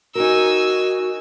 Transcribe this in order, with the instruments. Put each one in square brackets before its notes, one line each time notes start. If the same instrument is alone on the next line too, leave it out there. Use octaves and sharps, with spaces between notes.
[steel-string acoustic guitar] D#4 A#4 [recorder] F#4 [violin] G#5 E6